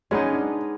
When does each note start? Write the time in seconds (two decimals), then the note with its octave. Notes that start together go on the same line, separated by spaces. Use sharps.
0.11 G#3 B3 C#4 D#4
0.33 D4